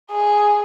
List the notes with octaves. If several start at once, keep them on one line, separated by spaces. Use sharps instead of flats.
G#4